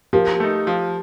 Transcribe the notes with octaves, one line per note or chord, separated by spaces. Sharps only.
F3 G4 A#4
A3 D#4
F3